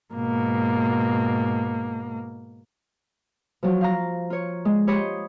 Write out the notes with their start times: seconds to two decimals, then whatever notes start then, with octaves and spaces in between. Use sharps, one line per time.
0.16 G#2 B2 A#3
3.63 F3 F#3
3.81 F5 A#5
4.30 F4 C#5
4.65 G#3
4.87 G4 C#5 B5 C6 D#6